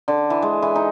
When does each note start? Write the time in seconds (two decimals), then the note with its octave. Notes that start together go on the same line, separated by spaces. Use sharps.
0.08 D3
0.30 E3
0.42 G#3
0.62 E3
0.75 D#4